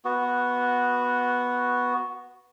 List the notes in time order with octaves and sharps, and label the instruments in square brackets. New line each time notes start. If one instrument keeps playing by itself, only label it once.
[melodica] B3 F#4